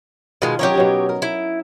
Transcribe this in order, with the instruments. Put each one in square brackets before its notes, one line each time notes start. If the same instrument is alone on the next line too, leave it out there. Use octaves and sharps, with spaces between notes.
[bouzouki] B2 G#3 [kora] D#3 F4 D#5
[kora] F#3 C#4 D#4 [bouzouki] G4 A#4 C#5
[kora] B2 F#3 D#4
A#4
[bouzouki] E4